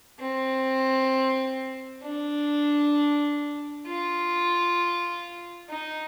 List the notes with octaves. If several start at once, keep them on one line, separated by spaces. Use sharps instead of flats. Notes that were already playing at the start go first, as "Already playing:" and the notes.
C4
D4
F4
D#4